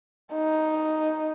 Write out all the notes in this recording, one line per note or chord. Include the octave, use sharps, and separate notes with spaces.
D#4